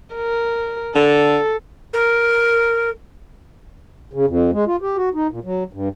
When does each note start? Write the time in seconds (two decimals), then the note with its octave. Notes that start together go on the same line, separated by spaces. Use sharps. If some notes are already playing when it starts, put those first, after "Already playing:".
0.16 A#4
0.95 D3 A4
1.93 A#4
4.13 C#3
4.28 F2
4.53 G#3
4.67 F4
4.82 G4
4.97 F#4
5.14 D#4
5.31 A#2
5.45 F#3
5.73 G2